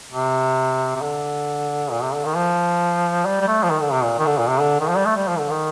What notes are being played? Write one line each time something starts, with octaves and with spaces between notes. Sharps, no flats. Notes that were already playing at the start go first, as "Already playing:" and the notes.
C3
C3
D3
A#2
C3
D3
D#3
F3
G3
G3
A3
F3
D#3
D3
C3
A#2
D#3
D3
A#2
C3
D3
D#3
F3
G3
A3
G3
F3
D3
D#3